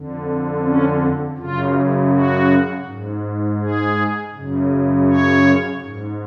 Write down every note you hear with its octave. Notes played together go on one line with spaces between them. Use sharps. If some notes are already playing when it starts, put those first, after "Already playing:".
Already playing: F2 D3
C#4
F#2 C#3 F4
F#4
G#2
G#4
F#2 C#3
C#5
G#2